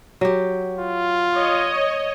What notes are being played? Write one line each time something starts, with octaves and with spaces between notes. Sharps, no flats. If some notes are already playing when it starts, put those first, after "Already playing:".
F#3 G4
F4
C#5 D#5